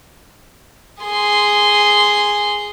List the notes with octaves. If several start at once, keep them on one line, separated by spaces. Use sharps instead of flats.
G#4 C6